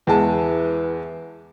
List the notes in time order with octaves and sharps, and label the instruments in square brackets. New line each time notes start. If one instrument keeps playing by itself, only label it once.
[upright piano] E2 G#3 A5 [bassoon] E3